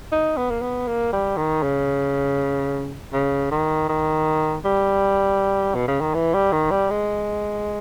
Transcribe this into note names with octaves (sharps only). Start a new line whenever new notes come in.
D#4
B3
A#3
B3
A#3
G3
D#3
C#3
C#3
D#3
D#3
G3
B2
C#3
D#3
E3
G3
D#3
G3
G#3